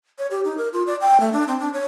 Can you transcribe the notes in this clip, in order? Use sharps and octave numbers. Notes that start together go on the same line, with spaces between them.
C#5
G4
D#4
A#4
F4
D5
G5
A3
D4
C4
D4
C#5